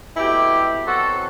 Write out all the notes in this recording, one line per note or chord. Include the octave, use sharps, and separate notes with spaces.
B2 A3 C4 E4 G4
B2 F#3 C4 F#4 A4